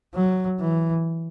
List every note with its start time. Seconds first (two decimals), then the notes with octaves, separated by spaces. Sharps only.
0.15 F#3
0.60 E3